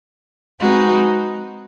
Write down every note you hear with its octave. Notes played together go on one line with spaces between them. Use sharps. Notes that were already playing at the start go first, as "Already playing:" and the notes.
G#3 C4 D#4 F#4 B4